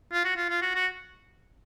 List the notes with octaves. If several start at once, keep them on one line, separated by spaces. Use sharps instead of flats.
F4
F#4
F4
F4
F#4
F#4